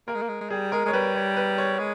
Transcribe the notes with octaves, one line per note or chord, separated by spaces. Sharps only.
A#3 A#4
G#3
A#3
G#3
G#3
G3 G#4
G#3 A#4
G#3 C#5
G3 B4
C#5
B4
C#5
G#3